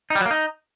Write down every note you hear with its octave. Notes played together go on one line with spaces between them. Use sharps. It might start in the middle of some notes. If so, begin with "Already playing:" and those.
D#4
G3
F#3
A#3
D#4